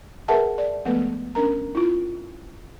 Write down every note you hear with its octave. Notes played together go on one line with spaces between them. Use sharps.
G#4 A#4 B4 E5 F#5 A5
D5
F3 G#3 A3 B3 A4 B4
C#4 D4 A#4 A#5
E4 F4